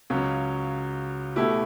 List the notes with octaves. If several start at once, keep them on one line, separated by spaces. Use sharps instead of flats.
C#2 C#3 F#3 C#4
B2 A3 E4 G4